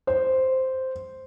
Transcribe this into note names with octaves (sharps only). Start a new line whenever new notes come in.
C5